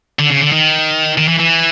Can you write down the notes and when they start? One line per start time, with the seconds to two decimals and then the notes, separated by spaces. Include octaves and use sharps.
0.19 D3
0.30 C#3
0.41 D3
0.52 D#3
1.18 D#3
1.28 E3
1.40 E3